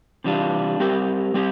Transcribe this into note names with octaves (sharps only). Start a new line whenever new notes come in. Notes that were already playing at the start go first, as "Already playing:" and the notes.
C3 E3 G3 D4 F4
G3 C4 G4 A#4
G3 C4 G4